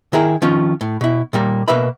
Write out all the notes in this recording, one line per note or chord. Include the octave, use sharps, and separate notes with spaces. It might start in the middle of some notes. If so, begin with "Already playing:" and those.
D#3 E4 G#4 A#4
D#3 F3 C#4 F4
A2
B2 E4
A#2 G3 A#3
B2 A#3 B4 E5 B5